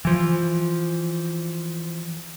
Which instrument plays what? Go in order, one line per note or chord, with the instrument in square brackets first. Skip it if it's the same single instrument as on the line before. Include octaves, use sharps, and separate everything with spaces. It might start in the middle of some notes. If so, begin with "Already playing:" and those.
[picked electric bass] E3 F3